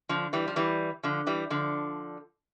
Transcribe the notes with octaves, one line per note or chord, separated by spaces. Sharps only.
D3 F3
E3 G3
F3
E3 G3
D3 F3
E3 G3
D3 F3